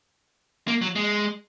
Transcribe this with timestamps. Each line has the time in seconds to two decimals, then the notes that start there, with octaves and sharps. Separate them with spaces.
0.68 A#3
0.82 F#3
0.95 G#3